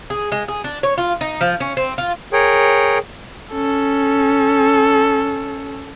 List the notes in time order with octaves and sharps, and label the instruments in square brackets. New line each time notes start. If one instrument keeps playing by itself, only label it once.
[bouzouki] G#4
G#3
G#4
D4
C#5
F4
D#4
F3
C#4
C4
F4
[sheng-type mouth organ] G#4 A#4 C#5 G5
[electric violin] C#4 A4